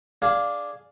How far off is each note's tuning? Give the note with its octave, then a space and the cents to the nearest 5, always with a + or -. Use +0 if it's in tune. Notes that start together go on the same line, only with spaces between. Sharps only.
D4 +0 G#4 +0 F5 +5